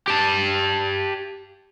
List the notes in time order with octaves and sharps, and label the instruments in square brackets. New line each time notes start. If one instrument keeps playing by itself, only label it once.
[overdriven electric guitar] G4 A5